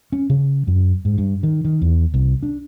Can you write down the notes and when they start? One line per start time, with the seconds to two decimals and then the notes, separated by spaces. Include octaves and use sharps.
0.12 C#4
0.30 C#3
0.67 F#2
1.05 G#2
1.18 G2
1.43 D#3
1.65 D#3
1.82 E2
2.14 C2
2.43 D4